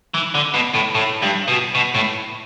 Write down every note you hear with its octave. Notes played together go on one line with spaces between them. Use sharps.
E3
D3
B2
A2
A2
G2
B2
B2
A2